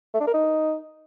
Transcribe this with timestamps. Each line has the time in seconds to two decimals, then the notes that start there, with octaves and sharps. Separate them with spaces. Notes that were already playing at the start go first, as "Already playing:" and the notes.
0.14 A3
0.20 D4
0.27 A#4
0.33 D#4